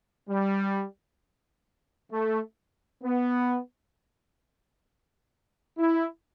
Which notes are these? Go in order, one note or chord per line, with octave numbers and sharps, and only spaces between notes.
G3
A3
B3
E4